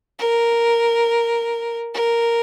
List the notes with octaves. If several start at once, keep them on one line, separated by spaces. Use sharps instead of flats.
A#4
A#4